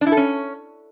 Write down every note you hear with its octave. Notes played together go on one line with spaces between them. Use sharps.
D4
E4
A4
C#4